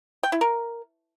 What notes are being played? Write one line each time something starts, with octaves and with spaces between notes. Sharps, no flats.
G5
E4
A#4